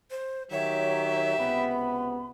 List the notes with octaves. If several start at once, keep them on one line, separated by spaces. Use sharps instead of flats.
C5
D#3 F#3 G4 C#5 E5
C#2 C3 B3 B5